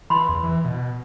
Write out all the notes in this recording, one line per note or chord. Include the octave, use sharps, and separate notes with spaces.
E3 B5 C6
E2
E3
B2